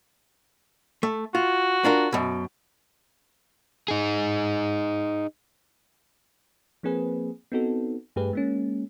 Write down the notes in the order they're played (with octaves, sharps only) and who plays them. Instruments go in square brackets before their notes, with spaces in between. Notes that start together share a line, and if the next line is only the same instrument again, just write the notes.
[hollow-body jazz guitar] A3
[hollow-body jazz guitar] F4 [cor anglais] F#4
[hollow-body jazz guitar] D4 F4 A#4
F#2 B2
[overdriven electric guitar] D#4 G#4
[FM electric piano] F3 A#3 C4 G#4 B4
B3 C4 D#4 F#4 A4
G2 A3 G4 G#4 B4
G#3 A#3 C#4